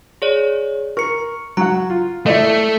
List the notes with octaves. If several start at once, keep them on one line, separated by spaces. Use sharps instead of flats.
G#4 C#5 D5
A#4 C#6 C#7
F#3 F#5 A#5
F4
A3 E4 D5 D#5